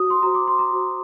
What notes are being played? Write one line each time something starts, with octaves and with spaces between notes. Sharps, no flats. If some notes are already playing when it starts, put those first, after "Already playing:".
Already playing: F#4 C5 D#6
C6
F#4 C5 A#5
D6
C6
A#5
F#4 C5